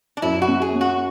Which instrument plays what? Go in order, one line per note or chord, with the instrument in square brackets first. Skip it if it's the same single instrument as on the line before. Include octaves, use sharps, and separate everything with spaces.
[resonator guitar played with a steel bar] D4
[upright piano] F#2 [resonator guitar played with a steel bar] E4
[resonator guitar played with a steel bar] F#4
[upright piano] C#4
[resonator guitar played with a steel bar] G#4
[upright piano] C#4
[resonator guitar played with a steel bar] F#4